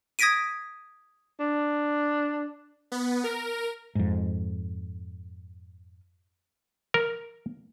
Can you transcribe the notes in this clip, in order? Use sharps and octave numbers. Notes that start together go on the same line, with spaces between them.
D#6 G#6 A#6 B6 D7 D#7
D4
B3
A#4
F2 G#2
A#4